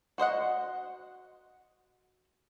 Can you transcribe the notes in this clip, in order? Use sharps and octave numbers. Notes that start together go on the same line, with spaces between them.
F#4 C5 D#5 F#5